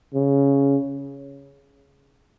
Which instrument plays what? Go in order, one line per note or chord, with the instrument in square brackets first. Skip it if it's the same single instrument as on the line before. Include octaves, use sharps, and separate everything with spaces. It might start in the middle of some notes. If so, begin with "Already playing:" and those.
[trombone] C#3